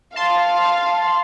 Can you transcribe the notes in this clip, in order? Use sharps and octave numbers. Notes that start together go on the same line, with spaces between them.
F5 A5 C6